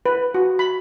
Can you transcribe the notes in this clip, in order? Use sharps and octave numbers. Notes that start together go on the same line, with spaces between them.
B4
F#4
B5